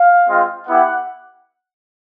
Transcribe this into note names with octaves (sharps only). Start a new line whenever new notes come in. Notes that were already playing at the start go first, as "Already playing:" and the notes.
Already playing: F5
G#3 C4 F4
B3 E4 G4 F#5